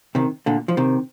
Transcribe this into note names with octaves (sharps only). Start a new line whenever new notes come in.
C3 D#3
A#2 D3
F3
C3 D#3